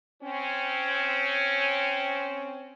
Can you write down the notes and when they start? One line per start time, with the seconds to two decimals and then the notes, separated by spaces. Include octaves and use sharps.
0.22 C4 C#4